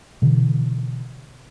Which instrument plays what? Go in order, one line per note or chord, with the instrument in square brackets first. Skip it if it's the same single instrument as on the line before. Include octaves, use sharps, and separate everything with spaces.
[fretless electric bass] B2 D3 E3